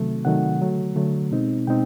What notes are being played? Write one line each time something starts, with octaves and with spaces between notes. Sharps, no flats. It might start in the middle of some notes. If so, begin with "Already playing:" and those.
Already playing: C3 D#3 F#3 A3
C3 D#3 F#3 A3 F#5
D3 F#3 A3
D3 F#3 A3
B2 G#3 C4 D#4
B2 G#3 C4 D#4 G5